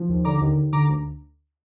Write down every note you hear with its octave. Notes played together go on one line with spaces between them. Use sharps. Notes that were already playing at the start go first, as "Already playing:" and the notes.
Already playing: F3
D#2
D3 A#5 D6
D#2
D#2
D3 A#5 D6
D2